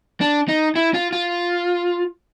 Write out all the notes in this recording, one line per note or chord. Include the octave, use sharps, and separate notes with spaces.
D4
D#4
E4
F4
F4